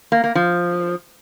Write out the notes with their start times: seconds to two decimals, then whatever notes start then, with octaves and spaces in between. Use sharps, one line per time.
0.12 A#3
0.24 A#3
0.35 F3